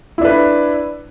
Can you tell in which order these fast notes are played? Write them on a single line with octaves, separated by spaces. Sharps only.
E4 D4 B4